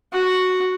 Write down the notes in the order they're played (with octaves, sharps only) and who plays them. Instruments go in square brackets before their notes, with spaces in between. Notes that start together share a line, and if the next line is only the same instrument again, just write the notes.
[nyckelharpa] F#4